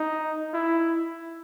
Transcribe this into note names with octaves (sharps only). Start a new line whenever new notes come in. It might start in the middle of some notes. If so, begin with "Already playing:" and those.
Already playing: D#4
E4